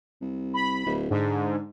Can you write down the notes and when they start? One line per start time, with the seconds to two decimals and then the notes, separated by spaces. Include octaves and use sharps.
0.21 C2
0.54 B5
0.86 D1
1.10 G#2 D3